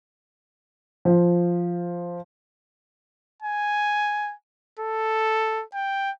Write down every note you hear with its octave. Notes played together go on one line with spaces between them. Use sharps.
F3
G#5
A4
G5